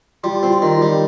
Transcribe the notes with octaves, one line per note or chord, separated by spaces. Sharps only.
G3 F4
C4
F4
D#3
G3